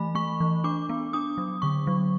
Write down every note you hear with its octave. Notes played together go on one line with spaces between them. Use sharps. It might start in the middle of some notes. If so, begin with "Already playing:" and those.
Already playing: E3 A3 B5
A3 C#6
E3
D4 D6
B3
D4 D#6
F#3
D3 C#6
F#3